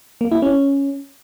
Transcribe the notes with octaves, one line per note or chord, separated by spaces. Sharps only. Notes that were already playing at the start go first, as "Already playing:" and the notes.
A#3
E4
C#4